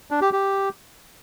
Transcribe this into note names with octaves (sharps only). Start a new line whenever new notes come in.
D4
G4
G4